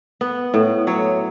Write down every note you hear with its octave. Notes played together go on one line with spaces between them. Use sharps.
B3
A2
F#3 C#5